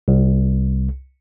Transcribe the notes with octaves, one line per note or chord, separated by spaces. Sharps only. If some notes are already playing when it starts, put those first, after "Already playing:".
C2